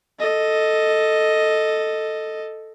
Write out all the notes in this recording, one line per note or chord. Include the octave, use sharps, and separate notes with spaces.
A4 D#5